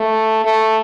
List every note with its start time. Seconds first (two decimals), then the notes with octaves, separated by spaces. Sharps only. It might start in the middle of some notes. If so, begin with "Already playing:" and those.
Already playing: A3
0.45 A3